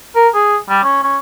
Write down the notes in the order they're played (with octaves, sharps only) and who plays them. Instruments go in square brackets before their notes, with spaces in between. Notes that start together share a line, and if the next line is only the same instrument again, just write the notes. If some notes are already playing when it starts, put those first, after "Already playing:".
[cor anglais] A#4
G#4
G3
C#4
C#4